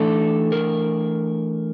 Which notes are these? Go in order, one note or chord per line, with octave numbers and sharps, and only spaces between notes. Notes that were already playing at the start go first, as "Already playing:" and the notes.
Already playing: E3 A3 D4 A4
A#4